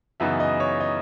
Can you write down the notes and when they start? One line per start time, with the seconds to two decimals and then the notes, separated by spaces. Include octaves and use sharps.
0.20 F#2 C#3 E3 B3 D#4 E5
0.40 D#5
0.60 C#5
0.80 D#5